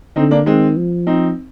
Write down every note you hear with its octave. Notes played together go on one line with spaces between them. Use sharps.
D3 C4 D#4
A#3 D4
D#3 G#3 C4
F3
C4 D#4